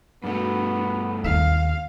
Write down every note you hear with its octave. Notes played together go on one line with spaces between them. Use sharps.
G2 A3 B3 D4 F#4
D#2 D3 F5